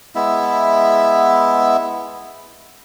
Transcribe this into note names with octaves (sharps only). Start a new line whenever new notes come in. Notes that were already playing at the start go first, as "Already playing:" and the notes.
G#3 B3 E4 E5